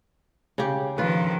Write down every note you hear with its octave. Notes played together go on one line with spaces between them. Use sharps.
C#3 G4
D#3 F3 F4 B4